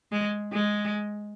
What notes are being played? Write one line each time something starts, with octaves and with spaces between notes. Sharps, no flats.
G#3
G#3